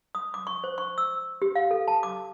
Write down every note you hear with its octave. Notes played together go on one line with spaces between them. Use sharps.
D#6
D6
C#6
C5
C#6
E6
G4
F5
A4
A5
D6